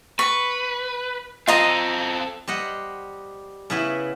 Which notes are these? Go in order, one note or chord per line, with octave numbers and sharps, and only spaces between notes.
B4 C#6
C4 F4 A4 D#5 A#5
G3 C5 D#5 F#5
C#3 B3 E4 B4 E5